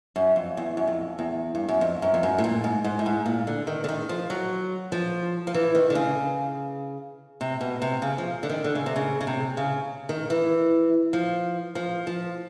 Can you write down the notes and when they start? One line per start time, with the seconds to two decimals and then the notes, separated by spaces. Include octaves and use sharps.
0.16 F#2
0.36 F2
0.57 E2
0.77 F#2
0.87 F2
1.19 E2
1.55 G2
1.69 F#2
1.81 F2
2.02 F#2
2.14 F2
2.23 F#2
2.38 A2
2.44 A#2
2.64 G#2
2.84 G#2
2.99 A2
3.06 G#2
3.26 A#2
3.47 D3
3.67 D#3
3.84 D3
3.89 D#3
4.09 F3
4.30 F#3
4.92 F3
5.47 F3
5.54 E3
5.75 D#3
5.90 D3
5.95 C#3
7.41 C3
7.61 B2
7.82 C3
8.02 C#3
8.18 F3
8.43 D3
8.49 D#3
8.64 D3
8.75 C#3
8.86 C3
8.96 C#3
9.21 C#3
9.27 C3
9.57 C#3
10.09 D#3
10.30 E3
11.13 F3
11.75 F3
12.07 F3